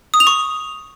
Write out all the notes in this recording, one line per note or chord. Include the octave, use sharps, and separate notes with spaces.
D#6
F7
C#6